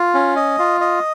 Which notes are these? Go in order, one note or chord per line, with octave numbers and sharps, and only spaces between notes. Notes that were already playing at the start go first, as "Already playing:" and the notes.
Already playing: F4
C#4
D#5
F4
D#5